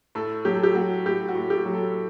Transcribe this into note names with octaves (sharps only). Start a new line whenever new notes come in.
A2 A4
F#3 G4
A4
G4
F#3 F#4
A2 G4
F#4
A2
G4
F#3
A4